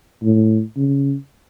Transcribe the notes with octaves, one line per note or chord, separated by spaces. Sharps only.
A2
C#3